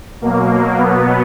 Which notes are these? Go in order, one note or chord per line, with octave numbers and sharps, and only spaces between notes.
B2 F#3 A#3
A#3
B2 F#3 B3